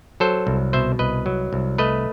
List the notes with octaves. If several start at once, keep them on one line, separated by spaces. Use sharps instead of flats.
F#3 A4 C5
C2
B2 C5 E5
C2 B4 D#5
F#3
C2
A3 B4 D#5